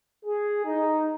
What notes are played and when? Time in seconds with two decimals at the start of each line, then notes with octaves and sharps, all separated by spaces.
0.25 G#4
0.64 D#4